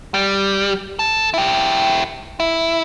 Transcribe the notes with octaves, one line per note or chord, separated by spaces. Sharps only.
G3
A4
E4 G4
E4